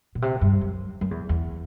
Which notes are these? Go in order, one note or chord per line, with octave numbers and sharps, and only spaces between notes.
B2
C3
G2
F#2
F#2
E2
E2